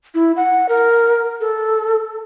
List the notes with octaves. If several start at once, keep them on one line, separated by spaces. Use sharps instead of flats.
E4
F#5
A#4
A4